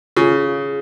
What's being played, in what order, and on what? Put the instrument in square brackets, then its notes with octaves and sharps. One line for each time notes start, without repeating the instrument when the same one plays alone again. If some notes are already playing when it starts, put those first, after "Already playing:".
[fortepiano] C#3 [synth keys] F4